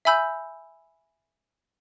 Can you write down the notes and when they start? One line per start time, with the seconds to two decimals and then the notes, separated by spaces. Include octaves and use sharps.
0.05 E5 G#5 B5 E6 G6